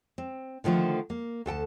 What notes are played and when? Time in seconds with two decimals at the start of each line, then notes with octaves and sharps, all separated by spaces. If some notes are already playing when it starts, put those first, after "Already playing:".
0.18 C4
0.64 D3 D#3 F3 A3 C5
1.10 A#3
1.46 D2 A4 G5 A5